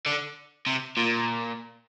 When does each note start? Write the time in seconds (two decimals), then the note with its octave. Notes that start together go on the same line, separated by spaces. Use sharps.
0.06 D3
0.66 C3
0.97 A#2